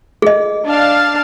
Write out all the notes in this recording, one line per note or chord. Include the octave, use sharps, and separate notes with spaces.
G#4 D#5
D4 F5 A5